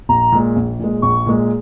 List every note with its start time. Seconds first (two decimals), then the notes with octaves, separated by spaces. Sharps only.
0.09 A#1 A#5
0.32 A#2 G#3
0.56 A#1
0.80 A#2 G#3
1.02 A#1 C#6
1.26 A#2 G#3